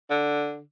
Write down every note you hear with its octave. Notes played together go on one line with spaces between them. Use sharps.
D3